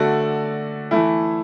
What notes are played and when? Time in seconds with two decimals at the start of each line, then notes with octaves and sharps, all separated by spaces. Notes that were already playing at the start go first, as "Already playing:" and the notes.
Already playing: D3 A3 F#4 D5
0.91 E3 A3 E4